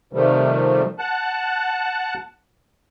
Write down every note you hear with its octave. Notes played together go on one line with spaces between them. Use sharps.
C3 D#3 F3 G3 A3
F#5 A5 F#6